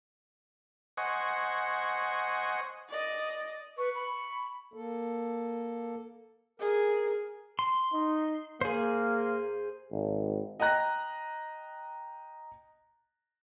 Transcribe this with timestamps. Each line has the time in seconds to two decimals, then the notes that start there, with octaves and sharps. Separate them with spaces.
0.97 C5 D#5 F#5 G#5 C#6
2.89 D5 D#5
3.77 B4 C#6
3.95 B5
4.74 A#3 A4
6.60 G#4 A#4
7.59 C6
7.93 D#4
8.61 A#3 G#4 C5
9.92 G#1
10.60 D#5 G5 A#5 F#6 A#6